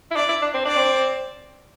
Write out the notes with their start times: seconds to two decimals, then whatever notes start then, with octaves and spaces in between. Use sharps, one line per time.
0.11 E4
0.16 D4 D5
0.28 E4
0.42 D4
0.54 C4
0.65 D4 D5
0.76 C4